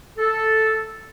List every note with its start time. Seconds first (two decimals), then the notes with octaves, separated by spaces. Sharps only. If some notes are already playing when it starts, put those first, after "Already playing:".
0.18 A4